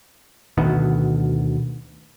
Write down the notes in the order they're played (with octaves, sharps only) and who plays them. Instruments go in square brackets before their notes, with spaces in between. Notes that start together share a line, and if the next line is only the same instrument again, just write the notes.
[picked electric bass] D2 B2 D#3 B3